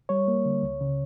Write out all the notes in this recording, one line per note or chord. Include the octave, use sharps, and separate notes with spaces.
G3 C#5
A#3
D3
C#2
C#3